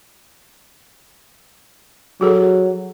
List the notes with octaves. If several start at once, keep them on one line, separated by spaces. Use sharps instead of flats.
F#3 F#4 G#4 A4